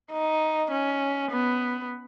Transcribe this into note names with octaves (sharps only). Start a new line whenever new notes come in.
D#4
C#4
B3